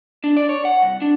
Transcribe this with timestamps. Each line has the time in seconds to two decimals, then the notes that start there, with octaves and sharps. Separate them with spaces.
0.24 D4
0.37 D5
0.49 C#5
0.65 F#5
0.82 C2
1.02 D4